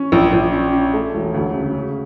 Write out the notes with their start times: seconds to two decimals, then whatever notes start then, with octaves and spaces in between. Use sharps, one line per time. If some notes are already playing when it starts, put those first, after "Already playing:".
Already playing: C#4
0.12 A#1
0.33 A#1
0.53 C#4
0.73 C#4
0.94 A3
1.14 E1
1.34 D2
1.54 C#3
1.74 C#3